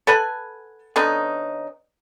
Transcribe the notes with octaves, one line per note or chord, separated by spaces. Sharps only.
A4 B4 F#5 G#5
D3 B3 C#4 D#4